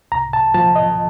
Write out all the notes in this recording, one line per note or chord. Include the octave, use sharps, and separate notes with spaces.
C2 A#5
A5
A#2 F3 A5
D#5